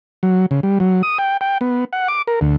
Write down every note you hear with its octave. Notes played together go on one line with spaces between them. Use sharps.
F#3
C#3
G3
F#3
D#6
G5
G5
B3
F#5
D6
A#4
D2